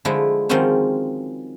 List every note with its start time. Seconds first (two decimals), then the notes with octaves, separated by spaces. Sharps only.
0.05 D3 F3 G#3 A3 E4
0.49 D#3 F3 F#3 G#3 C4 C#4